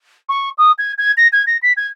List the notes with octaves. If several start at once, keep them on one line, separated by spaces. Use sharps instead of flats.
C#6
D#6
G#6
G#6
A#6
G#6
A#6
B6
G#6